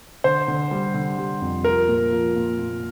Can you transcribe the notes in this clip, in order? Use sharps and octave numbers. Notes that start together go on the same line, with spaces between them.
D3 C5
D3
G3
D3
G3
F2
F3 A#4
A#2
F3
A#2
A#2